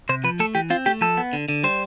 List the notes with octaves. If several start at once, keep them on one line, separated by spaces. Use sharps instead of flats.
C3 C5
F3 B4
A3 A4
E3 G4
C4 F4
A3 G4
F3 A4
B3
D3
D3
G3 C5